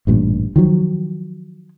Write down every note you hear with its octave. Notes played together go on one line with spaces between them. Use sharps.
A1 G2 A#2
D#3 F3 F#3